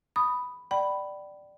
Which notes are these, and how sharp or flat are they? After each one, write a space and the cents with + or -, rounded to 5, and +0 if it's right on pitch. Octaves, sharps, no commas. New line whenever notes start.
B5 +0 D#6 +0
D5 +10 G5 -35 B5 +0